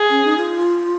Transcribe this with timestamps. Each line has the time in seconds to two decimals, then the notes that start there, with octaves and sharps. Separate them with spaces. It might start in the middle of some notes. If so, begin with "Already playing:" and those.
Already playing: G#4
0.10 C#4
0.24 D#4
0.37 F4